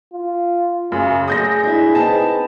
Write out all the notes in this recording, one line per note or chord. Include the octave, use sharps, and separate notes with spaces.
F4
F#2 C#3
F#3 A3 G#4 D5 D#6 G6 A#6
D4 E4
C4 D#4 B4 A5